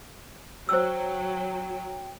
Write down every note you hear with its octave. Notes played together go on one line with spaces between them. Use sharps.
F#3 C5 G5 E6